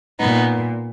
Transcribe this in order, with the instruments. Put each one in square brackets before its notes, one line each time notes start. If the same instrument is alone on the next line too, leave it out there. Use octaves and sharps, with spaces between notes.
[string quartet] A#2 B3 D#4